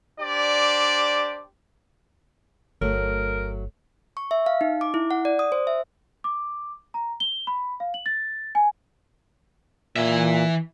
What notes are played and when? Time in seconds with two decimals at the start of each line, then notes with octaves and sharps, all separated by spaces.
0.21 D4 G4 C5 D5
2.81 G1 F#3 A3 A#4
4.17 C#6
4.31 E5
4.46 F5
4.61 D#4
4.81 D6
4.94 E4
5.11 F#5
5.25 D5
5.39 D#6
5.52 C5
5.67 E5
6.24 D6
6.94 A#5
7.20 G7
7.47 B5
7.80 F5
7.94 F#7
8.06 A6
8.55 G#5
9.96 A#2 E3 E5